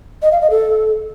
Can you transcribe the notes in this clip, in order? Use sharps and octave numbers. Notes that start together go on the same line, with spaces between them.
D#5
F5
D#5
A4